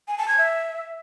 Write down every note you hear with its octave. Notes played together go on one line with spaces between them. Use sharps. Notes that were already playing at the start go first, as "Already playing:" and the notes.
G#5
A5
G#6
E5